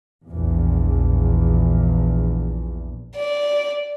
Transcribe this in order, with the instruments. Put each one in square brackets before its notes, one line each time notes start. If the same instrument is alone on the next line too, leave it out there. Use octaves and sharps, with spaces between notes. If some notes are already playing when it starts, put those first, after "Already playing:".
[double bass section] A#1 E2
[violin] D5